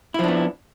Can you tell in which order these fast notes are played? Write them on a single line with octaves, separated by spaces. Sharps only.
E4 F3 D4 B3